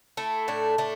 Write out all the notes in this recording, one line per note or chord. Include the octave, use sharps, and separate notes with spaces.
A3 E4
A2 D4
A3 D4